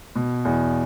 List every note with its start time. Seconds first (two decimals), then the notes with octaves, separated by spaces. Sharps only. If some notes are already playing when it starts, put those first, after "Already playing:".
0.16 B2
0.45 E2